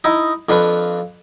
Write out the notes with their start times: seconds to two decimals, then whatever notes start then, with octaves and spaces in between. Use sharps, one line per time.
0.04 D#4 E4 D#5
0.49 F2 D4 F4 B4 C#6